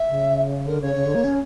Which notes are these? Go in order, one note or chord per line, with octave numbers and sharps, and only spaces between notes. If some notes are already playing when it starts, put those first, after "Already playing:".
Already playing: E5
C#3
D3 A#4
C#3 C#5
C#3
D3
A#3
C#4